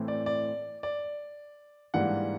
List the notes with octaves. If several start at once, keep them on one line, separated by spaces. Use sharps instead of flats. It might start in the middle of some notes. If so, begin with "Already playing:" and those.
Already playing: A2 E3 A3 C4
D5
D5
D5
G#2 E3 G3 A#3 D4 F#5